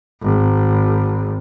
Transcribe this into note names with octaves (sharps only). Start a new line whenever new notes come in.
G#1